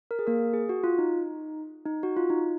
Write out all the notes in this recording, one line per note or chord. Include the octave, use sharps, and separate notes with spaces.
A#4
G#4
A#3 A#4
G#4
F#4
F4
D#4
D#4
F#4
F4
D#4